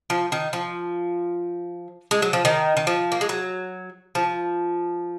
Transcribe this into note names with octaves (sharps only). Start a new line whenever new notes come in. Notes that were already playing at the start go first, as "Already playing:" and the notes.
F3
D#3
F3
G#3
F#3
F3
D#3
D#3
F3
A#3
G#3
F#3
F3